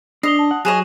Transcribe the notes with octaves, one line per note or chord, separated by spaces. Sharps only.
D4 D#5 C7 F7 G7
A5 D#6
F#5
F#3 G#4 C#5 D#5 F#6 D#7 E7